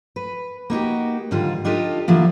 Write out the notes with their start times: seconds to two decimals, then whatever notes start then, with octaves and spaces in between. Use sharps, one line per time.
0.16 B4
0.70 A#3 D#4 F#4 G4
1.31 G#2 D3 D#3 G3 F4
1.65 D4 D#4 F4 G4 A4 D#5
2.08 D3 E3 F3 A#3